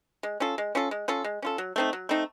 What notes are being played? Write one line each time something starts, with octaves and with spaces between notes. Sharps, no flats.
G#3
C#4 F4 A4
G#3
C#4 F4 A4
G#3
C#4 F4 A4
G#3
C#4 F4 A4
F#3
A3 C4 D#4
F#3
A3 C4 D#4